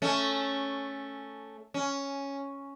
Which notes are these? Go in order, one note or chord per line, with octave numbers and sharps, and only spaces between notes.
A3 C#4
C#4